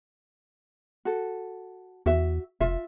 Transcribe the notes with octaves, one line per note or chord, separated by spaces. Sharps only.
F#4 A4
E2 F#4 E5
F1 F4 E5